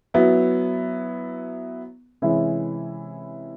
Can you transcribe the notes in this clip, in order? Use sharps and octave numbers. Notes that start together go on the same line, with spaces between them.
F#3 B3 E4
C3 E3 G#3 C#4 E4